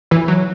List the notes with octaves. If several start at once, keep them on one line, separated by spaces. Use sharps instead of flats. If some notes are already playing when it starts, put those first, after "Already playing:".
E3
F#3